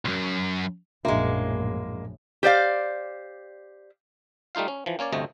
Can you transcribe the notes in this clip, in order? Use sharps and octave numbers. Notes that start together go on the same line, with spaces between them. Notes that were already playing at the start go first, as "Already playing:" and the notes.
C2 F#2
A#1 F#2 A2 G#3 A#3 D4 F#4 E5
G4 C5 D5 F5
G3 A3 D#4 F4 F5
C#4
E3 F3
A#3 C#4 C#5 D5
G1 D2 C3 A3 D#5